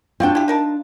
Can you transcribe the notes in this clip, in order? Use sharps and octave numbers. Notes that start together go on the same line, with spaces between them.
C4 D4 F4 F#4 G5
E4 G4
D#4 A#4 A5